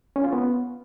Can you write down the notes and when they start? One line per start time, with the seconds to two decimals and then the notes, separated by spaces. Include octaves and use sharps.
0.16 C#4
0.24 F4
0.33 B3